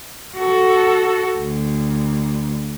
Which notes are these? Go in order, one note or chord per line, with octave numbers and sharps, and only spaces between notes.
F#4 A4
D2